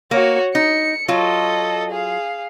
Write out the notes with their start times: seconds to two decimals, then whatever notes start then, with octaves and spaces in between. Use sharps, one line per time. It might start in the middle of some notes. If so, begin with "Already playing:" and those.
0.11 A#3 F#4 C#5
0.55 D#4 C#7
1.08 F#3 F4 A4 D#5
1.91 G#4 F5